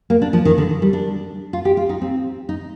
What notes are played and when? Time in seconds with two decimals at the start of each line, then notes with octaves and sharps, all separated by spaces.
0.10 A#3
0.22 D4
0.33 F3
0.45 D#3
0.58 D3
0.82 G3
0.93 D4
1.53 F4
1.65 G4
1.77 F4
1.89 D#4
2.02 C4
2.49 D#4